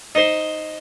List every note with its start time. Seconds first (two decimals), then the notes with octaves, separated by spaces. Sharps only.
0.15 D#4 C5